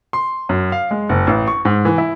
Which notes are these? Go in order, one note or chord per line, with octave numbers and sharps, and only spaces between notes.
C6
F#2
F5
G#3
F#1
A1
C#6
G#2
E3
E4